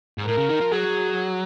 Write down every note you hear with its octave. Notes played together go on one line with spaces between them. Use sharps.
G#2
A2 A#4
C#3
D#3
F3
F#3 G#4